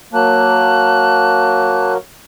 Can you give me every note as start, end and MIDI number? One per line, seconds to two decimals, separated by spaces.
0.13 1.97 54
0.13 1.97 58
0.13 1.92 81
0.13 1.92 90